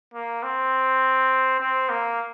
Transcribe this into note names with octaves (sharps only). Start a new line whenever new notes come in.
A#3
C4
C4
A#3